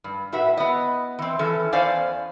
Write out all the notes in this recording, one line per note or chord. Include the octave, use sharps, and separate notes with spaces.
G2
A2 F#4 B4 E5
B3 D#5
E3 C4
E3 C#4 A4
E2 C#4 C5 D5 F5 G#5